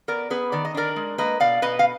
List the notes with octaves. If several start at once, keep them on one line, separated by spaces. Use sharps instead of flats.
B3 A#4 D5
B3 G#4 B4
D#3 D5
D#5
D4 A#4 D5
G#3
A#3 B4 D#5
B2 D5 F5
B2 B4 D#5
F5